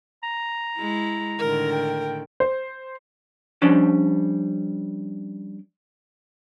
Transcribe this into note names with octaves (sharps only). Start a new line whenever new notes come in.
A#5
G#3 E4
A2 D3 D#3 A#4
G5
C5
F3 G3 C#4 D4